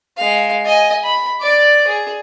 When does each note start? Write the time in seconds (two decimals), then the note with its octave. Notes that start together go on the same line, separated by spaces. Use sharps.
0.17 G#3 F5
0.66 D#5 G#5
1.04 B5
1.41 D5 D6
1.87 G#4